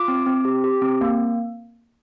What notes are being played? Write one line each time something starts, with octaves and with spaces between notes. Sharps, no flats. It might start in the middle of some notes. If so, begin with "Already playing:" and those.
Already playing: F4 D6
C4
C4
G4
G4
C4
A#3